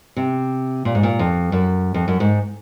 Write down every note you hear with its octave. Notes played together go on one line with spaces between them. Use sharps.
C3
A#2
G#2
A#2
F2
F#2
F2
F#2
G#2